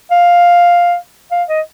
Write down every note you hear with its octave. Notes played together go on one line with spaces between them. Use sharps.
F5
F5
D#5